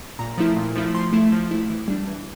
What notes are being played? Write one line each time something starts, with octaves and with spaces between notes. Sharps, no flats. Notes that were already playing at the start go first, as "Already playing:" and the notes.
A#2 A#5
F3 A3 E4
A#2
F3 A3 E4
F3 C6
A3 E4
F3
A3 E4
E3
G3 D4
E3